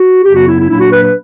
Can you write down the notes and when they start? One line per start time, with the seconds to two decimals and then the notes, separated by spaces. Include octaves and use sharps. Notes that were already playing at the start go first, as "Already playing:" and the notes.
Already playing: F#4
0.23 F#2 C#3 F#3 B3 G4
0.35 F#4
0.46 E4
0.58 E4
0.68 A#2 F#3 A#3 D4 E4
0.80 F#4
0.91 B4
1.02 B4